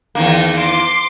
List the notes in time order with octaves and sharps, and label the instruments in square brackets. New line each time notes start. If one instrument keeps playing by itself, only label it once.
[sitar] E2 D#3 A#3
[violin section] C6 D6